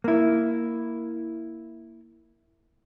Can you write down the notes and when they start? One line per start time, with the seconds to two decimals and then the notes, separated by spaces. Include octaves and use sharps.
0.04 A#3 E4